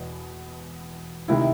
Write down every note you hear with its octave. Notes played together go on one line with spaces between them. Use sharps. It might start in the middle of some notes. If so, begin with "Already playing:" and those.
Already playing: E2 B2
D2 C3 D#3 E4